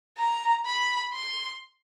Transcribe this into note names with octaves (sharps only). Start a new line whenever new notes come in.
A#5
B5
C6